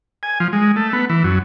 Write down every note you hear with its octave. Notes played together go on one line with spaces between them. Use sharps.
G#5
F3
G#3
A3
B3
E3
F#2